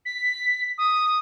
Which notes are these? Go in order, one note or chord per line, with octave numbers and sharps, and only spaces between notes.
B6
D#6